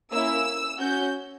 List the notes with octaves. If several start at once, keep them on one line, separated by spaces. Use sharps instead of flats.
A#3 C#4 E4 E6
C#4 F#4 G6